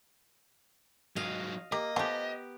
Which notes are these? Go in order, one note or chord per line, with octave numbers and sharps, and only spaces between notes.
G#2 F#3 D#5 F5
A#3 G4 D#5
F3 A3 B3 G4 G#5